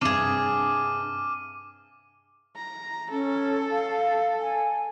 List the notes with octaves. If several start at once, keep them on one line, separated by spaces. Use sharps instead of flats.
G2 C3 D4 G#4 D6 F6 D#7
A#5
C#4 A4
F5
G#5